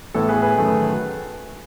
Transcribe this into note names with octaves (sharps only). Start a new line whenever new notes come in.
A2 E3 B3 A4
G#4 B4
G#4 B4
F#2 D#3 F#3 A3